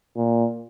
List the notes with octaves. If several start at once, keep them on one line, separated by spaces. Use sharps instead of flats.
A#2